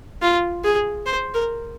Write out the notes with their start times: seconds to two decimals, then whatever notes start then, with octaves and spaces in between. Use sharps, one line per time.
0.22 F4
0.64 G#4
1.06 C5
1.34 A#4